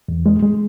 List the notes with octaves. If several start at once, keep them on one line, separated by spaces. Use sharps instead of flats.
E2
G#3
G#3